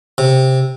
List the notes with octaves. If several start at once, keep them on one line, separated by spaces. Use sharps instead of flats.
C3